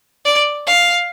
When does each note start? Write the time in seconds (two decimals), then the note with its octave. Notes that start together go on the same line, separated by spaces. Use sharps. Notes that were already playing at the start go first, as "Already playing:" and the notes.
0.25 D5
0.67 F5